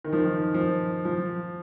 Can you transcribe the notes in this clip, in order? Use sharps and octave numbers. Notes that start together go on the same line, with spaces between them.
D#3
F3
D#3
F3
F3